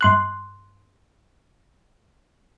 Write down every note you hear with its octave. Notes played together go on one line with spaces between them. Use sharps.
G2 C6 F#6